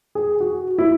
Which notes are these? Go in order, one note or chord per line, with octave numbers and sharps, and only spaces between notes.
G#4
F#4
E4